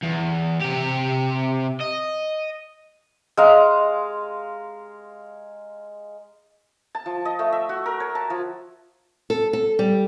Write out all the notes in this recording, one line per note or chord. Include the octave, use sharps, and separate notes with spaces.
E2
C3 G4
D#5
G#3 F5 A#5
A5
F3
D#5
A3
E5
F#4
A#4
C#5
A5
F3
A4
A4
G3